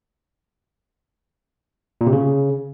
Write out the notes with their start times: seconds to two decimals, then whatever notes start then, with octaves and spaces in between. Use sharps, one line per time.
2.01 A#2
2.07 C3
2.13 C#3